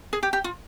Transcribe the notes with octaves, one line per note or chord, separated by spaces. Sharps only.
G#4
G4
G4
F4